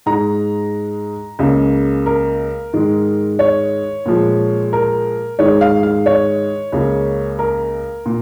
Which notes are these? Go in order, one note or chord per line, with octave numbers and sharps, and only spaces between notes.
G#2 G#3 A#5
C#2 C#3 A#3
A#4
G#2 D#3 G#3
C#5
A#2 F3 G#3
A#4
G#2 D#3 G#3 C#5
F5
F5
C#5
C#2 C#3 A#3
A#4
A#2